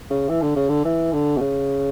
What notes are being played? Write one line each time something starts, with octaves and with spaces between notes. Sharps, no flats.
C#3
E3
D3
C#3
D3
E3
D3
B2
C#3